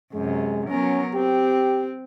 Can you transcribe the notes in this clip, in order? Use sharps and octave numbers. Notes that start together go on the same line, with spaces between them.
F#2 C3 G#3
F#3 B3 C#4 A#4
C4 G4